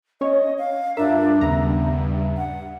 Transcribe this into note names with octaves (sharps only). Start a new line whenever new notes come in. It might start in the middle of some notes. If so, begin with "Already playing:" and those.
C#4 C#5 D#5
F5
G2 D4 F4 A#4 E5
D#2 C#3 B3 E5 A#5
F#5